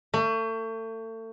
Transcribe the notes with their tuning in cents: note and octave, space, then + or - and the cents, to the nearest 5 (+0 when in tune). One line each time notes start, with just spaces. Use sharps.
A3 +35